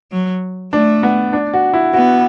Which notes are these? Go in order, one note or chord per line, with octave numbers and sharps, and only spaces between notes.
F#3
A3 D4
B3
D4
F#4
E4
B3 F#4